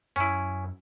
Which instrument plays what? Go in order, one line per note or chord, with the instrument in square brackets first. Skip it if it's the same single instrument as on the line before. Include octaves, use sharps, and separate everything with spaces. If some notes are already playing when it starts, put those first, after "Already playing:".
[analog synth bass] F#2 [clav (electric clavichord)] C#4 E4